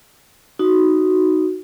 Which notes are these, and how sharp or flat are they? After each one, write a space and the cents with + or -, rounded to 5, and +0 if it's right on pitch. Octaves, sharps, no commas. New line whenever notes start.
D#4 +0 F#4 +0